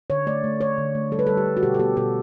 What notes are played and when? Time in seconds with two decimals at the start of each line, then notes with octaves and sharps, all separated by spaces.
0.10 D3 C#5
0.26 A3 D5
0.44 A3
0.61 A3 C#5
0.78 D3
0.95 A3
1.11 G3 A4
1.19 B4
1.27 G3 A4
1.37 G4
1.46 G3
1.57 F#4
1.63 B2 G4
1.74 A4
1.80 B3 G4
1.97 B2 A4